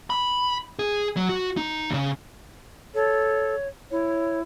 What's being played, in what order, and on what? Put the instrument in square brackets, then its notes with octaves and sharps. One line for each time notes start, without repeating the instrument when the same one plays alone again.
[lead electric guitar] B5
G#4
F#3
F#4
D#4
D#2 C#3
[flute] A4 [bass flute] C#5
[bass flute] E4 [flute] C#5